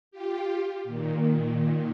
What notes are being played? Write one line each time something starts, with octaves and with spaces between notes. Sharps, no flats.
F4 G4
A#2 D#3